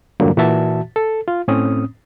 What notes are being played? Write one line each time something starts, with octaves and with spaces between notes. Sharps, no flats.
E2 G2 A#2 D3 F#3 A#3
A#2 E3 F#4 E5 A5
A4
F4
A2 C4 C#4 D#6